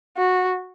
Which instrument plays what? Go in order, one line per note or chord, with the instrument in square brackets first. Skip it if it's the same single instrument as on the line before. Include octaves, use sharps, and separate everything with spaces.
[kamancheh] F#4